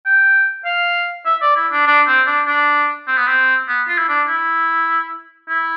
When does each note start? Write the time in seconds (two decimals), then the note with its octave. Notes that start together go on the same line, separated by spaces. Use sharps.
0.06 G5
0.65 F5
1.26 E5
1.42 D5
1.56 E4
1.72 D4
1.87 D4
2.07 C4
2.27 D4
2.47 D4
3.07 C4
3.16 B3
3.27 C4
3.68 B3
3.88 F4
3.98 E4
4.09 D4
4.28 E4
5.49 E4